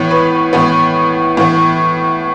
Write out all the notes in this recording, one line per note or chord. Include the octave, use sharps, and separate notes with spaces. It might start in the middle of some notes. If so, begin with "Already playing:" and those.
Already playing: A2 E3 B3 C#5
B4
A2 E3 B3
A2 E3 B3